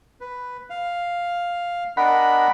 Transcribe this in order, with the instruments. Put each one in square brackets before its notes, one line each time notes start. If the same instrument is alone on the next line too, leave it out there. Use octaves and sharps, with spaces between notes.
[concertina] B4
F5
[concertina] D4 A#4 D#5 [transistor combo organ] F#5 B5